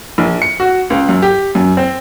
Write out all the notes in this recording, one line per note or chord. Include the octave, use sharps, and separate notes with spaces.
A#1
C#7
F#4
C#2
F#2
G4
F#2
C4